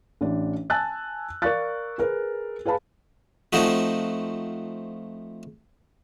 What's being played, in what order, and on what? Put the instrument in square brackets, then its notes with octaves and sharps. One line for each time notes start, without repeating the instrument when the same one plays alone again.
[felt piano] A1 D4
G#5 A5 E6 F#6 A6
A#4 D5 F5 C#6 F#6 A6
G#4 A#4 B4
G#4 B4 F5 A5 B5
[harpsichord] F3 A3 C4 D#4 F#4